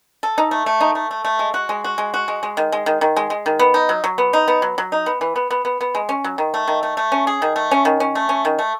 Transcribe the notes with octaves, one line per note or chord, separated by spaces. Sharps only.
A4
D#4
A3
A3
D#4
A3
A3
A3
G#3
F#4
G#3
F#4
G#3
F#4
G#3
G#3
D#3
G#3
D#3
D#3
G#3
G#3
D#3
B3
D#4
F#3
F#3
B3
D#4
B3
F#3
F#3
D#4
B3
E3
B3
B3
B3
B3
G#3
C#4
F#3
D#3
A3
D#3
A3
A3
C#4
G#4
D#3
A3
C#4
D#3
C#4
A3
C#4
D#3
A3